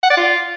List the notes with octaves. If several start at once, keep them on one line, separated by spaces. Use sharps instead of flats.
F#5
D5
F4